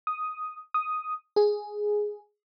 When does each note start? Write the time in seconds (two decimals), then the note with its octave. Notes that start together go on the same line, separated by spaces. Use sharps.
0.07 D#6
0.74 D#6
1.36 G#4